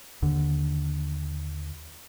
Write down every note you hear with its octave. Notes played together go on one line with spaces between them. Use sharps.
D#2 D3